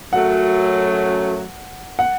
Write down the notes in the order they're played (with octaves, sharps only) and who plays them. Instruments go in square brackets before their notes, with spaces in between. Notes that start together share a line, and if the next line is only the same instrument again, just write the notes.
[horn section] F#2 F#3 A3 [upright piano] F#5
[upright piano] F#5